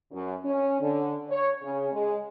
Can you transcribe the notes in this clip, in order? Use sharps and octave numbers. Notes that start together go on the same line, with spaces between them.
F#2
C#4
D3
C#5
C#3
G#3